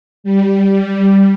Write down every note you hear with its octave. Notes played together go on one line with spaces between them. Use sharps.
G3